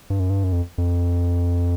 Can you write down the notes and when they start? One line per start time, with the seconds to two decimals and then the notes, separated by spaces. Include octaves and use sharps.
0.10 G2
0.20 F#2
0.30 G2
0.44 F#2
0.52 F2
0.78 F2